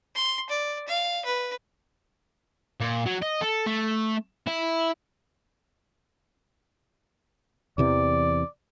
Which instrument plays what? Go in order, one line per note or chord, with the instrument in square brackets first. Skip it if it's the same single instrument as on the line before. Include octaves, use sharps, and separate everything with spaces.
[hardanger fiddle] C6
D5
F5
B4
[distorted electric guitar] A#2
F#3
D#5
A4
A3
E4
[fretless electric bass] E2 C3 E3 [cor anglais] D5